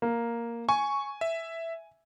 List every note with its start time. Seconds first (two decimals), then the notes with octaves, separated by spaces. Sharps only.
0.02 A#3
0.69 G#5 C#6
1.21 E5